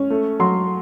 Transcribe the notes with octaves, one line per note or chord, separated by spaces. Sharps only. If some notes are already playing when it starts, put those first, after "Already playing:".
Already playing: C#4
A3
F#3 C6